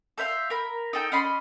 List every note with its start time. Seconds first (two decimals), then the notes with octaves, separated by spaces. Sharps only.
0.18 A4 C5 E5 F5
0.50 A#4 B5
0.93 D#4 A4 G5
1.12 C#4 D#5 B5 C6